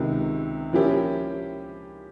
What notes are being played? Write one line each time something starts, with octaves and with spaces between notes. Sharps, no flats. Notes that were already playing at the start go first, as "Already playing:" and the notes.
Already playing: C#2 C3 D#3
F3 A#3 C#4 E4 G4